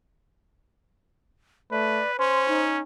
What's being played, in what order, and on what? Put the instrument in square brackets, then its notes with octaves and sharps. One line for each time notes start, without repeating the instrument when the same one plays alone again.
[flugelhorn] A3 [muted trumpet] B4 [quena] D5
[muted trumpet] C#4 [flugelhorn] C5 [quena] C6
[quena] D#4